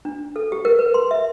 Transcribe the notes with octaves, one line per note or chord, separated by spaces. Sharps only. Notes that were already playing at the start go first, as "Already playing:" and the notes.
D4
A4
G4
A#4
B4
C6
E5